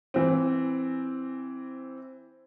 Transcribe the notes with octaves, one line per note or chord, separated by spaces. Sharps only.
E3 C4